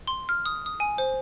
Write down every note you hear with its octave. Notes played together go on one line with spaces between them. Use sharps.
C6
F6
D#6
D#6
G#5
C5